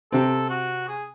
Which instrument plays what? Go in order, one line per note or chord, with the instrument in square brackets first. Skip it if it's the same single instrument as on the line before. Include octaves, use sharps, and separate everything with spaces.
[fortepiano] C3 C4 [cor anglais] A4
[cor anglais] F#4
G#4